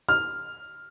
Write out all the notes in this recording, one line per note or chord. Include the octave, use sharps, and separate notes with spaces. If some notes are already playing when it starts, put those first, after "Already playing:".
F6